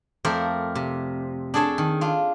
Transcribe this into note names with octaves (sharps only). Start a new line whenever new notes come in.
F2 A3 A#4 C5 D5
C3
D4 G#4 A4 C#5 A5
D#3
D4 F4